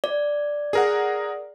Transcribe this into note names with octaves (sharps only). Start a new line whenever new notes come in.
D5
G#4 A#4 F#5